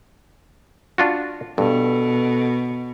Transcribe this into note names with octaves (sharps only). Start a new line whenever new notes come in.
D4 F4 F#4
G2 B2 A4